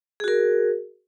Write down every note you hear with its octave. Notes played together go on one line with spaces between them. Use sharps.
F#4 G#4 A#4